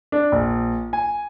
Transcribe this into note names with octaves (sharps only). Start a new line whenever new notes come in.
D4
A#1
G#5